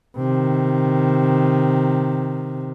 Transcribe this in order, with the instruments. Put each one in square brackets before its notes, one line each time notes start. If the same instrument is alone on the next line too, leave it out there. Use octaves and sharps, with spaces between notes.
[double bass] C3 D#3